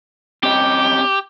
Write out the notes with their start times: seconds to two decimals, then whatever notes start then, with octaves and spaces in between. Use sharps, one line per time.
0.43 C4 C#4 G4 D#5